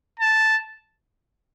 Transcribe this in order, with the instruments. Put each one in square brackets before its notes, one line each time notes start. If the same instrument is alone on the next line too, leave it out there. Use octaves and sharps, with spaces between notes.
[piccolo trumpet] A5